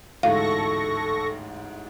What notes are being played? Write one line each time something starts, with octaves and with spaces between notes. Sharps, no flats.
A1 D2 G#2 A4 F5 C#6 A#6